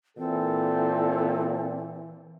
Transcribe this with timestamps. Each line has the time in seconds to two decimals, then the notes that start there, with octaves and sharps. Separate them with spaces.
0.17 A#2 E3 C4 A4